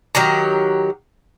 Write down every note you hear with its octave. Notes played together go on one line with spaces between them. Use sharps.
D#3 F#3 G4 A#5